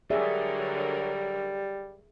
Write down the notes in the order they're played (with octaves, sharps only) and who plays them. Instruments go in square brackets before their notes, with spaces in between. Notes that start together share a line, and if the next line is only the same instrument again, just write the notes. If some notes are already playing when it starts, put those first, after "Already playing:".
[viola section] D3 F#3 A#4 [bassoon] G3 [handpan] G#4 D5 E5